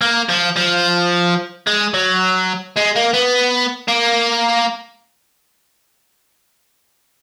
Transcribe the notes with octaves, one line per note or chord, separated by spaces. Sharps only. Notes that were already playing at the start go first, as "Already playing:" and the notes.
A#3
F3
F3
G#3
F#3
G#3
A#3
B3
A#3